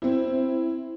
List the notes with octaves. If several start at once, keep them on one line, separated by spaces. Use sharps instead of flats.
C4 E4